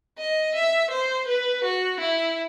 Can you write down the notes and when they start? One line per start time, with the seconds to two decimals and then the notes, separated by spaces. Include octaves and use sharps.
0.18 D#5
0.55 E5
0.91 C5
1.28 B4
1.64 F#4
2.00 E4